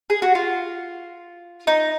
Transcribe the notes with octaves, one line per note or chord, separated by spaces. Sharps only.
G#4
F#4
F4
D#4